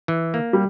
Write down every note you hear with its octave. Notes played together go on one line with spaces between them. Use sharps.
E3
A#3
G3